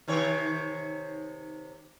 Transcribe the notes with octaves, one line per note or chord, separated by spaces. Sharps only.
C3 D#3 C#5